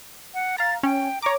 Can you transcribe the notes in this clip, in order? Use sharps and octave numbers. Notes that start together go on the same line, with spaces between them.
F#5
F5 A#5 A6
C#4 G5
C#5 A#5 D6